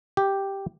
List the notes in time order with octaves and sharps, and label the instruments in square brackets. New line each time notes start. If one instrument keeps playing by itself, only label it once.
[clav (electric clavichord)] G4